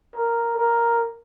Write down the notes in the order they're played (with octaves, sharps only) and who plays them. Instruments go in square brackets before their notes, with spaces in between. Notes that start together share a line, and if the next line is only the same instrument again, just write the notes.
[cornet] A#4
A#4